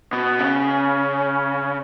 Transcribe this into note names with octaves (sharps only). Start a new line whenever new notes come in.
B2 B3
C#3
C#4